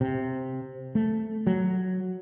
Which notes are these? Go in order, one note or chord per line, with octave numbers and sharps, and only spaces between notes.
C3
A3
F#3